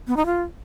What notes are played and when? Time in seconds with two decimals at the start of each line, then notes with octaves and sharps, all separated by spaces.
0.07 B3
0.17 D#4
0.26 F4